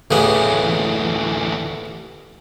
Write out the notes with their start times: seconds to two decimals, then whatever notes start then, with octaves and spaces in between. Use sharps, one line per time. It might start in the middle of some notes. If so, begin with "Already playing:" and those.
0.11 A1 D2 C#3 E3 B3